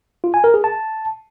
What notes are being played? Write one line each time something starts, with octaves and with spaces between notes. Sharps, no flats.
F4
G#5
A#4
G#4
A5